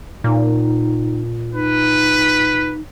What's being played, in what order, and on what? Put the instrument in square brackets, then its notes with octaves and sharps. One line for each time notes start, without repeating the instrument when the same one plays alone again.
[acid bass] A#2 [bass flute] D#4
[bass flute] D#4 [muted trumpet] B4